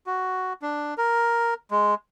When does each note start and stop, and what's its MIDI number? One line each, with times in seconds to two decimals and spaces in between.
0.06 0.53 66
0.62 0.94 62
0.98 1.54 70
1.71 1.95 56